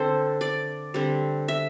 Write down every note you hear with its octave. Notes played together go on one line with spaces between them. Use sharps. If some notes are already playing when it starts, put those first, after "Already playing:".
Already playing: D3 C4 A4 C5
D5
D3 G3 C4
E5